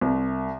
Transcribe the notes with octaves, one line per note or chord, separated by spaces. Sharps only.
C2